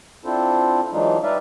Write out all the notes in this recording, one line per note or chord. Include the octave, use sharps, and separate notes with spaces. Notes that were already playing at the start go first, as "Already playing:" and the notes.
C4 D4 E4 F4 A4 C5
E3 F#3 G#3 D4 D#4 F4
G3 D#4 B4 D5 E5 F5